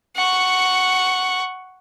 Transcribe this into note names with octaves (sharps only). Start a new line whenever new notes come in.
F#5 C#6